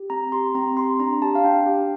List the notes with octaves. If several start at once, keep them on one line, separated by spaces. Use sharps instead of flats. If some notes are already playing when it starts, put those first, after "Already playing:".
Already playing: G4
C4 A#5
G4 C6
C4 A#5
G4 C6
D4 A#5
G4 A5
F5
D4 G5
G4